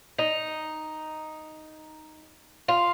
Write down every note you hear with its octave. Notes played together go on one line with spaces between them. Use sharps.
D#4
F4